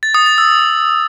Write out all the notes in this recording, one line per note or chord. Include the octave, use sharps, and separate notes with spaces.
A6
D#6
A6
E6